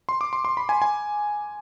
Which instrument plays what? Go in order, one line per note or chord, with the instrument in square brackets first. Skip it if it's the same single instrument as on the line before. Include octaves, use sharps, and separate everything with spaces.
[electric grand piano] C6
D6
C6
C6
B5
G#5
G#5